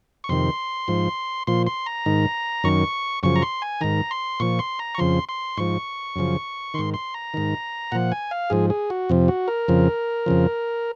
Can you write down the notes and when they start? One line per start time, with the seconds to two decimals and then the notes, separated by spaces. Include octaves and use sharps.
0.24 C#6
0.29 F2 C3 D#3 C6
0.88 G#2 F3
1.47 A#2 F3 C6
1.67 C6
1.86 A#5
2.06 G#2 D#3
2.64 F#2 D#3 C#6
3.23 F#2 C#3 F3 C#6
3.36 A#5
3.42 C6
3.62 G#5
3.81 G#2 D#3 A#5
4.11 C6
4.40 A#2 F3 C#6
4.59 C6
4.79 A#5
4.95 C#6
4.98 F2 C#3 F3 C6
5.29 C6
5.57 G#2 F3 C#6
6.16 F#2 C#3 F3
6.74 G#2 D#3 C6
6.94 C6
7.14 A#5
7.34 G#2 D#3
7.92 A#2 F3 F#5
8.12 G#5
8.31 F5
8.50 G#2 F3 G#4
8.70 G#4
8.90 F#4
9.09 F2 C3 F3
9.28 F#4
9.48 A#4
9.68 F2 C#3 F3
10.26 F2 C#3 F3